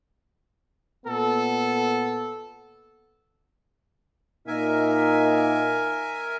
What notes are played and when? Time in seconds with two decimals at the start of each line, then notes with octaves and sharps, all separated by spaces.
1.06 A#2 B3 A4
4.47 A#2 A#3 D#4 A#4 E5 G#5